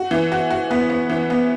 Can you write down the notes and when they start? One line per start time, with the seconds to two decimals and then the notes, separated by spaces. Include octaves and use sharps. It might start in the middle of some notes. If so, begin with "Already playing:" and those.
Already playing: F#4
0.11 E3
0.32 F#4
0.51 F#4
0.71 B3
0.90 B3
1.10 E3
1.30 B3